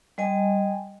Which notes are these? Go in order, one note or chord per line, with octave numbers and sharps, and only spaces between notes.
G3 D#5 G#5